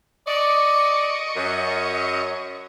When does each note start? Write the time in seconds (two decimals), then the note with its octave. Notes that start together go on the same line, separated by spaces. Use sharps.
0.27 D5 D#5 C#6
1.36 F#2